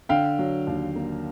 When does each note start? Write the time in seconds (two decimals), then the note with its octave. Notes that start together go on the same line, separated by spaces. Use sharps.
0.09 D3 F5 G5
0.39 F#3
0.67 D#2
0.96 A#3